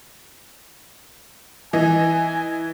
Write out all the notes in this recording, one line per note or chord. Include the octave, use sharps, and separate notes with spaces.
E3 D#5 G#5